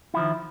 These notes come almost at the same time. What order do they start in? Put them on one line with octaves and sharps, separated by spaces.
E4 F3 D#3